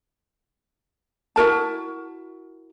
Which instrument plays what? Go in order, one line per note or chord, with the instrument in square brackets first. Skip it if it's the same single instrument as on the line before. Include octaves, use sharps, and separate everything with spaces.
[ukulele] E4 F#4 A#4 A5